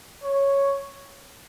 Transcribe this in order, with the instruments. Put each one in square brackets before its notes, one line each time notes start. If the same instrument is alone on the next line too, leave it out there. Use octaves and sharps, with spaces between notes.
[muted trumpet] C#5